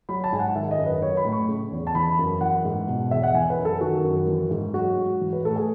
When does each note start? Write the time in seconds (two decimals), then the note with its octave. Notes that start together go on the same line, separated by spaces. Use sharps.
0.09 F#3 B5
0.24 A5
0.32 G#2 G#5
0.39 F#5
0.56 D#3 E5
0.71 D#5
0.78 F#2
0.86 B4
1.02 F#3 C#5
1.17 B5
1.25 A2
1.32 C#6
1.48 C#3
1.72 E2
1.87 A5
1.95 E3 B5
2.19 F#2
2.41 E3 F#5
2.65 G#2
2.87 B2
3.11 E2 E5
3.23 F#5
3.34 E3 G#5
3.50 B4
3.59 F#2
3.65 A4
3.81 D#3 F#4
4.04 F#2
4.28 E3
4.51 G#2
4.74 F#3 F#4
4.98 G#2
5.21 E3
5.33 B4
5.45 A2 A4
5.56 G#4